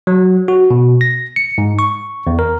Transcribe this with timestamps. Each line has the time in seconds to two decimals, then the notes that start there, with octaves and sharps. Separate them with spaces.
0.07 F#3
0.48 F#4
0.70 B2
1.01 A#6
1.36 C#7
1.58 G#2
1.79 C#6
2.27 E2
2.39 A#4